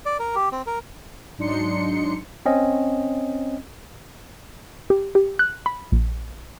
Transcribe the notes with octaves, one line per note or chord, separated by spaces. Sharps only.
D5
A#4
G4
C4
A#4
G#2 F#3 D4 D#4 C6 C#7
C4 C#4 D#5
G4
G4
F#6
B5
A#1